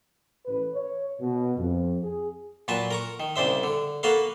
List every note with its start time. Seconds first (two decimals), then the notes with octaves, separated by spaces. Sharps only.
0.46 A1 B4
0.75 C#5
1.21 B2
1.58 F2
2.04 G#4
2.68 A#2 F#3 B4 A5
2.91 A#4 A#5 C#6
3.20 D#3
3.36 C2 C#3 D4 C5 E5
3.63 D3
4.03 A#3 F#4 A4 B4 F5